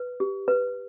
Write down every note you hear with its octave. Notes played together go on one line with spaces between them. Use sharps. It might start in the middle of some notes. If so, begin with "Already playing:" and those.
Already playing: B4
G4
B4